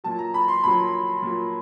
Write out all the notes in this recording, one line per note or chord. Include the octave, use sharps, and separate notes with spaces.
A#2 F#3 A5
A#5
B5
C6
A#2 F#3 B5
A#2 F#3